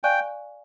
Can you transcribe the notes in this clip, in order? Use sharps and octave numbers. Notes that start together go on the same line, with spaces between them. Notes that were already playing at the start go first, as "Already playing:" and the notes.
D5 F5 G5 G#5 C#6 F#6